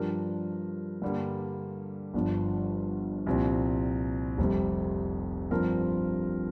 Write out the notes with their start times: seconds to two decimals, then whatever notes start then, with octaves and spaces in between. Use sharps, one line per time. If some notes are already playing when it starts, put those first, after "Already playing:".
Already playing: G2 F3 D4 G4 A#4
1.02 G2 D3 G3 A#3
2.14 G1 G2 F3 D4
3.26 C2 A#2 F3 C4
4.38 F1 F2 C3 G3 C4
5.51 G2 F3 C4 A#4